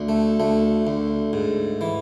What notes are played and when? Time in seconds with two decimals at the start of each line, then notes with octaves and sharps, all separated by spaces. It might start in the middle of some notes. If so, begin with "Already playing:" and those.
Already playing: D2
0.09 A3
0.40 D2 A3
0.87 D2
1.33 G#2
1.81 E3